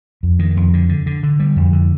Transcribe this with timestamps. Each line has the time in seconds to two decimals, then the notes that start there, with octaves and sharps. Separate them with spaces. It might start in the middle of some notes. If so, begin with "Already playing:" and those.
0.23 F2
0.39 D#3
0.57 F2
0.74 D3
0.89 D3
1.06 D3
1.23 D3
1.40 G3
1.56 F2
1.73 D3